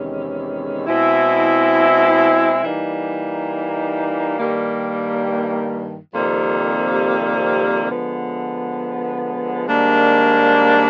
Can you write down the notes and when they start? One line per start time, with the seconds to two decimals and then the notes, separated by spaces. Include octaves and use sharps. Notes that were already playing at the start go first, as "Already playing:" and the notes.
Already playing: E2 C3 D#3 G#3 C#4
0.86 B2 G#3 C4 E4
2.62 E3 G3 A#3 D#4
4.37 G2 D#3 G3 A#3
6.13 F2 C3 D#3 G3 A#3
7.89 D3 F3 G#3 B3
9.65 G#2 D#3 G3 A#3 D4